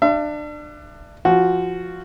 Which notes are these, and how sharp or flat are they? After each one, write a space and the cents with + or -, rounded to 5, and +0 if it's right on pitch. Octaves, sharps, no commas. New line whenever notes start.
D4 +25 E5 +45
F3 -10 F#4 +0